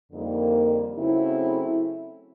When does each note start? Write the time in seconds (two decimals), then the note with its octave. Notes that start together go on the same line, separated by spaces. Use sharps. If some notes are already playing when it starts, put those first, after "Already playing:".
0.11 F2 D3 G3 A#3 D#4
0.97 C#3 F#3 A3 C4 E4